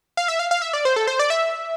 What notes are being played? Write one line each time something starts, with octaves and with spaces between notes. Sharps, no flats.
F5
E5
F5
F5
E5
D5
C5
A4
C5
D5
E5